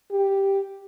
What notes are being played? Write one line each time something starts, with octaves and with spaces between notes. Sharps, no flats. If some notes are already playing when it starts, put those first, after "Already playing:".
G4